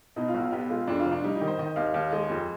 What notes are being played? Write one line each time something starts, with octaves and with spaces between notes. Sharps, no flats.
B2 D#4
F4
B1
F4
B3 G4
G#3 F4
F2 D4
F4
F1
D4
G3 D#4
D#4
D#3
C5
D#3 D#5
D#2 F5
D#2 F5
G#3 D#5
F2